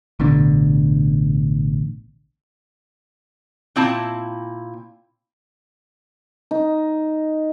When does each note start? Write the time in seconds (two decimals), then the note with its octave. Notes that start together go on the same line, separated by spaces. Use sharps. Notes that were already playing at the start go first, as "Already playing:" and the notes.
0.20 A1 B2 D3
3.76 A#2 C4 E4 A5
6.51 D#4